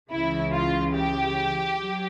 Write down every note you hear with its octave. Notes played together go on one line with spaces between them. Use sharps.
C#2 C#3 E3 E4
F4
G4
F#3